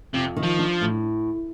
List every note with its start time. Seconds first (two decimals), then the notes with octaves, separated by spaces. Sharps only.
0.14 F2 C3
0.36 D#3
0.43 F3
0.59 D4
0.81 A2